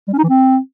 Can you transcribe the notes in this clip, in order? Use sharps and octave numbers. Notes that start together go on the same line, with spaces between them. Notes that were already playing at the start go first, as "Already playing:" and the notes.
G3
C#4
D#4
E3
C4